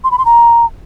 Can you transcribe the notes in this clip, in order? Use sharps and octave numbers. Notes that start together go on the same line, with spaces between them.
C6
B5
C6
A#5